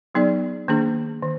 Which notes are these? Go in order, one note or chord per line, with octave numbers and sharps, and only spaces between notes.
F#3 B3 D#4 G#4 D5
D#3 A#3 D4 G#4
D#3